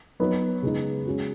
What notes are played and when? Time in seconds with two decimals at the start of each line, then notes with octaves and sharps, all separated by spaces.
0.20 F#3 B3 D#4
0.62 C#3 G#3 B3 D#4
1.06 G#3 C#4 F#4